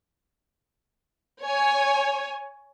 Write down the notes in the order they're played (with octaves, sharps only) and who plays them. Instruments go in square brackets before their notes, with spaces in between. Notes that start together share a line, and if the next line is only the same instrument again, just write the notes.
[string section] C#5 G#5